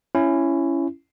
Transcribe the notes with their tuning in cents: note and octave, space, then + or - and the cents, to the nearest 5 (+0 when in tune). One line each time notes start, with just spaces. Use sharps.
C#4 +0 E4 +20